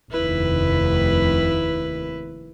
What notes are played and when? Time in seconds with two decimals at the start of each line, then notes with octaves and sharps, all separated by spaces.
0.11 F1 D#2 D#3 E4 B4